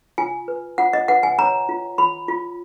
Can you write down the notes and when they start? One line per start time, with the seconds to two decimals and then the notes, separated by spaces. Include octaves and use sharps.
0.18 F4 G#5
0.48 B4
0.78 F4 F#5
0.93 D#5
1.08 B4 F#5
1.23 G#5
1.38 C#5 A#5
1.69 F4
1.98 F4 B5
2.28 F4